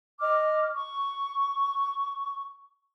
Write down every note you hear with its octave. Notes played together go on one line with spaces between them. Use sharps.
D#5 D6 F6
C#6